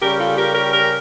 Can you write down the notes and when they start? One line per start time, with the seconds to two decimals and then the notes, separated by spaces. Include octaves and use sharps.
0.02 C#3 G3 C#4 G4 A#4
0.19 F4 A4
0.38 G4 A#4
0.55 G4 A#4
0.73 G4 A#4